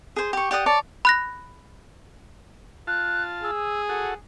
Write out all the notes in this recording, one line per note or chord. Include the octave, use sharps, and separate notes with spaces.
G#4 C5
G4 C#6
G4 D5 F#5 D#6
C#5 D5 A5
B5 F#6 A#6
F4 A5 F#6
G#4 E6
F#4 A4 F#5